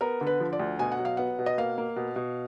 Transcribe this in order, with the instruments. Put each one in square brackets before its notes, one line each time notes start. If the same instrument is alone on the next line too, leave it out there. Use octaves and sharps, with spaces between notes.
[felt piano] B3 A#4
D3
B4
F3
D5
D2
B2 G#5
F#5
F#3
F5
B3 F#5
B2
D#5
A#3 F5
A#3
B2
B2